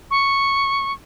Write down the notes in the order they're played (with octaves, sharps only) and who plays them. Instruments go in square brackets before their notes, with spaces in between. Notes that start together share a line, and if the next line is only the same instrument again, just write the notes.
[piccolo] C#6